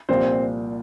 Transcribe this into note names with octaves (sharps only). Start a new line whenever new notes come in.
C2 A#2 F3 C4 C5